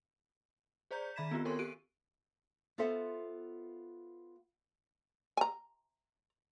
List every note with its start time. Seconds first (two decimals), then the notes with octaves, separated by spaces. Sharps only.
0.91 G#4 C5 D5 A#5 G6
1.16 D#3 E5 B5 G#6 B6 E7
1.31 B3 C4 F4 G4
1.45 A4 A#4 C#5 G#5 C6 C#6
1.59 G4 D7 D#7
2.78 B3 F4 A4 C5 E5 F#5
5.37 G#5 A#5